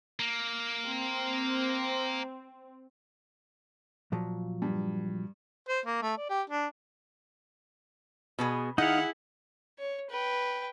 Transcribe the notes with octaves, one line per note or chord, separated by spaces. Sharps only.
A#3
C4
A#2 F3 F#3
G2
C5
A#3
A3
D5
G4
D4
B2 B3 G#4
D#3 D#4 E4 G#4 F5 F#5
C#5
B4 G5